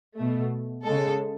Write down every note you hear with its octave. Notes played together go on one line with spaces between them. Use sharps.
B2 A3
C#3 G#3 A4